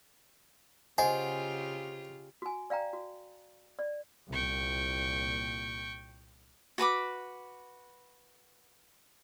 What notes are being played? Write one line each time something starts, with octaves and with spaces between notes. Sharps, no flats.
C#3 F4 G4 C5 D#5 F#5 G#5
F#4 G#5
D5 F5 G5 A#5
F#4
D5
C2 A#2 G5 C#6
F#4 B4 B5 D6